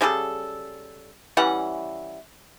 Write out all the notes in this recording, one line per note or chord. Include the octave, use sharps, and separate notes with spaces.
C#3 G3 G#4 A4
E3 G3 C#4 F#5